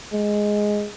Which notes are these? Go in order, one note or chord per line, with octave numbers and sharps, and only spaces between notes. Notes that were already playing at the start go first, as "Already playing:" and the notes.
G#3